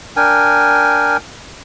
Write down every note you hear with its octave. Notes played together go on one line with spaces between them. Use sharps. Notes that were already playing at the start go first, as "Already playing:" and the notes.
D4 A#4 G5 G#5